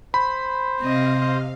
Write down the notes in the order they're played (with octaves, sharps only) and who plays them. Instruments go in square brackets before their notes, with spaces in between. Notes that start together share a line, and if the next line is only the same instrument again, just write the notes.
[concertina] C5 [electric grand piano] B5
[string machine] C3 F5 [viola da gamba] C4 D#5